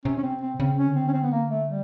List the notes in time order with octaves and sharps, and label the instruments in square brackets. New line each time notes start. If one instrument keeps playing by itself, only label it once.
[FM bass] C3 [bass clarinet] C#4
[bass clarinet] C#4
C4
C4
[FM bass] C#3 [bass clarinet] C4
[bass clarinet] C#4
[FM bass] D3
[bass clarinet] C4
C#4
C4
B3
A#3
A3
G3